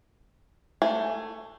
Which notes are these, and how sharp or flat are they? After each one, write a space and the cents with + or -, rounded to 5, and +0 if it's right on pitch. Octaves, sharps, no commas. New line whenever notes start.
A3 +15 G#5 -5